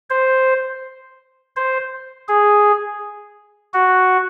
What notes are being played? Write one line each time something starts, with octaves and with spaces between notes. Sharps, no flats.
C5
C5
G#4
F#4